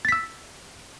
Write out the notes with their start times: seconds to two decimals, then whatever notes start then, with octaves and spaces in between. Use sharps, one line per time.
0.05 A6
0.09 B6
0.12 E6